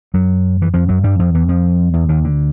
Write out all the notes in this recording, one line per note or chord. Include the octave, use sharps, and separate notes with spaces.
F#2 F#3
E3
F2 F3
F#2 F#3
G2 G3
F2 F3
E2 E3
F2 F3
E2 E3
D#2 D#3
D2 D3